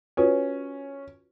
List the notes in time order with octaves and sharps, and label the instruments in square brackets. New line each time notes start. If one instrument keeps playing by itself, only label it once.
[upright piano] C#4 [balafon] F4 F#4 B4